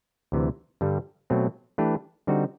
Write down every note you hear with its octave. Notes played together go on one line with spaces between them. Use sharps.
D2 C3 E3
G2 D3 G3
B2 F#3 A3 C4
E3 A3 D4 G4 B4
D3 G3 C4 D#4 F#4